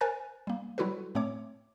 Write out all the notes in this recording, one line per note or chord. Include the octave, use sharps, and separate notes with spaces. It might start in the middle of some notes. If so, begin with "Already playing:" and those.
A#4 C5 G#5 A#5 F#6 A6
G3 A#3
F#3 G3 E4 F#4 A4 B4
A2 A3 C4 C#5 D6